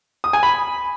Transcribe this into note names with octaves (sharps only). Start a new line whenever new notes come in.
D#6
G#5
B5